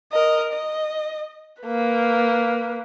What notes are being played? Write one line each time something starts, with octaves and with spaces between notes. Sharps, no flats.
A#4 D#5
D#5
A#3 B4